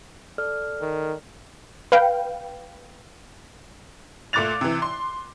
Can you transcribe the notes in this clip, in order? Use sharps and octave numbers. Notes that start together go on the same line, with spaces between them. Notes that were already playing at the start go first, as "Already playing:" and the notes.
A4 D5 F6
D#3
B4 F5 G5
A#2 A3 D6 F#6 A6 F7
C3 E3
C6